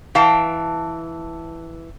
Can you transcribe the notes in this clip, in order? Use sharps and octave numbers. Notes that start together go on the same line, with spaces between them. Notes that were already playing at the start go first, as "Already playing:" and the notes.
E3 F5 G5 A5